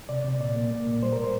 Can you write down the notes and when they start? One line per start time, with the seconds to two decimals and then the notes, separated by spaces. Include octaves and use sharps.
0.09 C3 D5
0.24 C3
0.40 A#2 D5
0.56 A#3
0.71 A#3
0.87 A#2
1.03 G3 C5
1.13 A2 A#4
1.24 C5